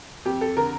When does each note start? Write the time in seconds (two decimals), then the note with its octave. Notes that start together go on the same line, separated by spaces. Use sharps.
0.25 F2 G4
0.41 A4
0.57 D3 A#4